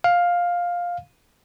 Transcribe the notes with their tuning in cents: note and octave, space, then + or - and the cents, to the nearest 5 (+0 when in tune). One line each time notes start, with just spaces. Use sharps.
F5 +10